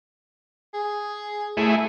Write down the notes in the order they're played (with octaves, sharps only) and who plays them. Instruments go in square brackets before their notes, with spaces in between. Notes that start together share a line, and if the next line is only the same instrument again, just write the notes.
[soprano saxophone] G#4
[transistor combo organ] A3 E4 G#4